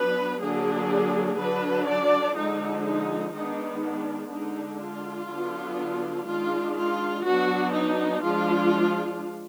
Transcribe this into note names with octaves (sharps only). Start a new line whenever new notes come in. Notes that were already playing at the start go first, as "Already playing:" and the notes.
Already playing: F#3 B3 D4 B4
D3 F#3 A#3 D4 G#4
D3 F#3 D4 B4
D5
D3 F3 G#3 D#4
D#4
D#3 G#3 B3 D4 D#4
D4
D3 G#3 D4 D#4
F4
D3 F#3 B3 D4
D#3 G#3 D4 F4
F4
F#3 B3 D4 F#4
D#4
F3 G#3 D4 F4